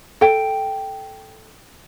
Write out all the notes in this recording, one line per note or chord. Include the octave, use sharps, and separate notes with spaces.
A4 G5